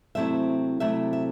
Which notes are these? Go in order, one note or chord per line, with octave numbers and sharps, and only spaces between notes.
C3 F#3 A3 C4 E4 E5
C3 F#3 A3 C4 E4 E5
E5